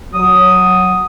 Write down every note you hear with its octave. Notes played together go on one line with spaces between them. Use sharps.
F#3 D#6